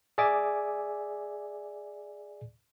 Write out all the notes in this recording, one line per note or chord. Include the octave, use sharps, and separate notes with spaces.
G#4 D5 E5 G#5 D6